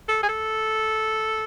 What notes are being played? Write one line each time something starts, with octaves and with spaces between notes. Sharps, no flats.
A4
G#4
A4